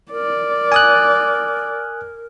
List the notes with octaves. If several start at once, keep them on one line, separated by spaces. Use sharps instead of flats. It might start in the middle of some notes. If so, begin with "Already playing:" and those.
A#4 D5
G#5 D#6 F#6